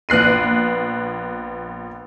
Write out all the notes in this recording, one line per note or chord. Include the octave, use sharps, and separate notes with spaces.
A#1 B3 F#6 C7 D#7